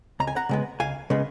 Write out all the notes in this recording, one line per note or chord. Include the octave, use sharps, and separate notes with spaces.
C#2 A#5
G#5
F#5 A#5
C#3 G#3 B3
C#2 F5 G#5
C#3 G#3 B3